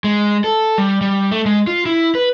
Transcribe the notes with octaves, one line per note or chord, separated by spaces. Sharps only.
G#3
A4
G3
G3
A3
G#3
F4
E4
B4